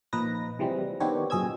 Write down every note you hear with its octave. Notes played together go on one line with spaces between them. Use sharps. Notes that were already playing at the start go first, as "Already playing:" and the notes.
A#2 F3 D#4 B4 A#6
C3 E3 F3 G3 G#3 C4
D#3 B3 C4 D4 G4 C#5
F#2 A#2 G#4 D#5 E6 G#6